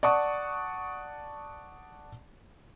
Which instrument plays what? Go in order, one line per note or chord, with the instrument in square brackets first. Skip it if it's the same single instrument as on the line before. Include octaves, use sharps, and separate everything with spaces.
[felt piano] D5 F#5 A5 C#6 D#6